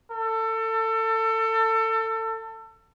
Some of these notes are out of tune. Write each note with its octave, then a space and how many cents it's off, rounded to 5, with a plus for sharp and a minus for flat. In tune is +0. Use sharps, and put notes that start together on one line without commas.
A4 +25